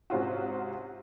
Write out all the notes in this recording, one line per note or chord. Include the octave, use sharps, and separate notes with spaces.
G#2 C3 C#4 F4 F#4